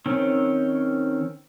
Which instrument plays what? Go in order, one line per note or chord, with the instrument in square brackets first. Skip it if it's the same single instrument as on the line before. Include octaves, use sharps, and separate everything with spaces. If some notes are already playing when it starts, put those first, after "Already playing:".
[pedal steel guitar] D#3 C4 C#4